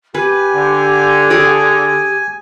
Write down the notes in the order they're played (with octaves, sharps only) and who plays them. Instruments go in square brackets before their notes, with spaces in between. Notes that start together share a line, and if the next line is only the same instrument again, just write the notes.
[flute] G4 [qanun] B4 [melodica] G#5
[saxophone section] D3
[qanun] G#4 D5